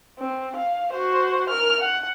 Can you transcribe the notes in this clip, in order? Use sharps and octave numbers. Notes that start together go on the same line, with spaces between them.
C4
F5
F#4 C5
A#4 F6
F#5